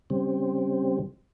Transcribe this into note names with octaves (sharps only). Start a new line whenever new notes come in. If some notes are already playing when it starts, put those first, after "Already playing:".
C#3 G3 C4